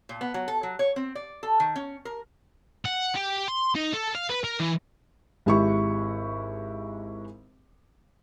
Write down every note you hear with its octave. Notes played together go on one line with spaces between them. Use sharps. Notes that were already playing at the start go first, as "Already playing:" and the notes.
A#2
B3
F#3
A4
F#3
C#5
C4
D5
A4
D#3
C#4
A#4
F#5
G4
C6
D#4
A4
F5
B4
A#4
E3
G#1 G#3 E4 G4 C#6